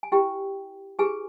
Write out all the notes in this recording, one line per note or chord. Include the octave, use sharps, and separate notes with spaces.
G#5
E4 G4 B4 G5
E4 G4 G#4 B4 G#5